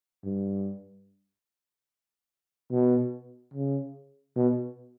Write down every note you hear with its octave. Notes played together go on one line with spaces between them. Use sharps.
G2
B2
C#3
B2